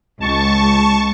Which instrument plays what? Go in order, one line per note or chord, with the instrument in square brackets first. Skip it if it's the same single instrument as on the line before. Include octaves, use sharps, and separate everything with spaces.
[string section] C#2 [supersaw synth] A5 C#6